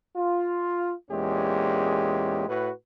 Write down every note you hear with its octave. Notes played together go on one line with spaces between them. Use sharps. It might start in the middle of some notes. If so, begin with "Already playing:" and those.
F4
E2 A#2 G#3 C#4 G4
A2 F#4 B4